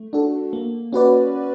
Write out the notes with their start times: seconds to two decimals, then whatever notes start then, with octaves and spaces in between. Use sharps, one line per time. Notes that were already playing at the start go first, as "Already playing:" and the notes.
Already playing: A3
0.13 D4 F#4 A4
0.53 A#3
0.93 C#4 F#4 B4 D5